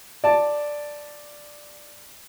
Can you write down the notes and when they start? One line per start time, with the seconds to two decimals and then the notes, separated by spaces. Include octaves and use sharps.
0.24 D5 A5